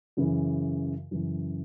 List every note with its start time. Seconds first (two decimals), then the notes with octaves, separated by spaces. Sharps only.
0.17 F#2 C#3 E3
1.11 F#2 C#3 E3